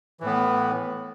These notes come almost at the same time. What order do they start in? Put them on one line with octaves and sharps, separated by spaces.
E3 A2 B3